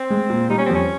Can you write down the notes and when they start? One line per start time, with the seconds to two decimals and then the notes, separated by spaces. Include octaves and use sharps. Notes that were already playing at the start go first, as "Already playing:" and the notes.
Already playing: C4
0.10 G#3
0.30 A#2
0.49 G3 D#4
0.58 C#4
0.66 C4
0.70 F2
0.75 C#4